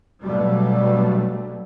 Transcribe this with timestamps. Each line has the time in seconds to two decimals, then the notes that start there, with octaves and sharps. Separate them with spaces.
0.22 G2 B2 F#3 G3 A3